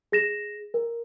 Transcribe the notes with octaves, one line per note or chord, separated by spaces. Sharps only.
G#4 A#6 E7
A#4